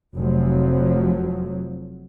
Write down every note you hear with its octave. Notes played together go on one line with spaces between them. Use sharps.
F1 F3 F#3